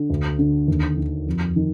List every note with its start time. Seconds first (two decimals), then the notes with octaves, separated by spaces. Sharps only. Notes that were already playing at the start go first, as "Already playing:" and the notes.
Already playing: D3
0.10 D2
0.39 D3
0.68 D#2
0.97 D#3
1.26 F2
1.56 D#3